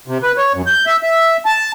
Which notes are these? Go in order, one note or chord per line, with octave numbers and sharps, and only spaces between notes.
C3
B4
C#5
F#2
G6
E5
E5
A5